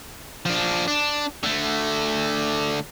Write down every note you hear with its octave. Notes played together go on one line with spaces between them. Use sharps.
F3 D4
D4
D3 A3